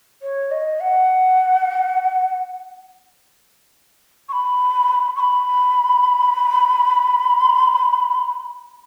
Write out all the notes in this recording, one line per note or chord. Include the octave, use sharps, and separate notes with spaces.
C#5
D#5
F#5
C#6
B5
C#6
B5